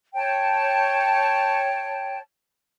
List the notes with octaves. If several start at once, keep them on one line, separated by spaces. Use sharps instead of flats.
C#5 G5 A5